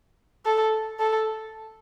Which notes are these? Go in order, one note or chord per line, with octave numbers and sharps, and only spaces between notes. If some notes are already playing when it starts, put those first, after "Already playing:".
A4
A4